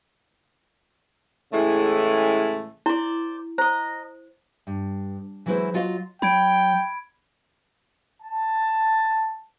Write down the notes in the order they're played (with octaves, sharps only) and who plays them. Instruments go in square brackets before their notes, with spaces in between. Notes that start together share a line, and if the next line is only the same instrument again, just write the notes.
[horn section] A2 C#3 E3 G#3 A3
[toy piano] E4 [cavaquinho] C5 D5
[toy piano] C5 [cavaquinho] D#5 A#5
[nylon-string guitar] G2
E3 F#3 G#3 E4 B4 C5
F#3 F4 F#4 D#5 F5
[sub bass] F#3 [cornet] G5 [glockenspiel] B5 G#6 D7
[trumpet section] A5